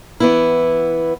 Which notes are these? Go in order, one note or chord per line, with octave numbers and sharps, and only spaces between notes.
E3 B3 E4